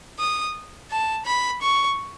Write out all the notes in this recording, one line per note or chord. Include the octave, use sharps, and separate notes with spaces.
D#6
A5
B5
C#6